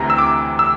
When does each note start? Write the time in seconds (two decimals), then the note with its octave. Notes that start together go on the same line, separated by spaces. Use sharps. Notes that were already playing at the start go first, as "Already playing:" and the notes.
Already playing: D2 C3 E3 A#5
0.10 E6
0.18 D6
0.59 E6